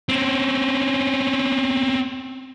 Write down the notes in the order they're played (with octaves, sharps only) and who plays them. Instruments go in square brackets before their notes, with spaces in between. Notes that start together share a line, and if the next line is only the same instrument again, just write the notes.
[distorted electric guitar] C4 C#4